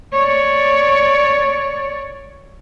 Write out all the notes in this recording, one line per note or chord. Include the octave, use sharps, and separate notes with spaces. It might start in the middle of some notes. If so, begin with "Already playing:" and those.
C#5 D5